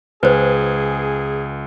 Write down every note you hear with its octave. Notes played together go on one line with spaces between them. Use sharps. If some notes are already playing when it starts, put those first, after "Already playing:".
C#2 G#4 B4 C5